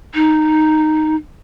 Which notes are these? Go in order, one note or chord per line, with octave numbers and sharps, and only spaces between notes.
D#4